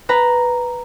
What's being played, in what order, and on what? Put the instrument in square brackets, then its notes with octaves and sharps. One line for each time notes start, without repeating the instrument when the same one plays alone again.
[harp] B4 A#5